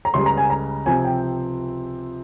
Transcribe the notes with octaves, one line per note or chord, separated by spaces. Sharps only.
A#5
C#2 C#3 G3 C6
A#5
G#5
A#5
C3 F3 C4 G#5
G5